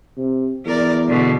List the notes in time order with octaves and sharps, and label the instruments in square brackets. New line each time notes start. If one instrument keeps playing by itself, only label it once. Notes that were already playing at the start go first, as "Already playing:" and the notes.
[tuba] C3
[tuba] E2 [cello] A#4 D5
[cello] B2 D3